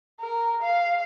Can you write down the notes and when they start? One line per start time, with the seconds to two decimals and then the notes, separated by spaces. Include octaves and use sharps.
0.21 A#4
0.62 F5